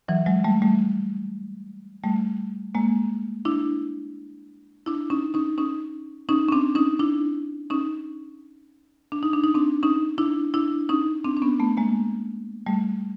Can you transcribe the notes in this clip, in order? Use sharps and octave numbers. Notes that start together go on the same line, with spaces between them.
E3 F#3
F#3 G#3
G3 A3
G3 A3
G3 A3
G#3 A#3
D4 E4
D4 E4
C#4 D#4
C#4 D#4
C#4 D#4
C#4 D#4
C#4
C4 D4
C#4 D#4
D4 E4
C#4 D#4
D4
D#4
D4
D#4
C4 D4
C#4 D#4
D4 E4
D4 E4
C#4 D#4
C4 D4
D4
B3 C#4
A3 B3
G#3 A#3
G3 A3